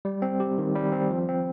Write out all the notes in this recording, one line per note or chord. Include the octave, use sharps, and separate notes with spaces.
G3
C4
G4
D#3
G3
C4
F3
C4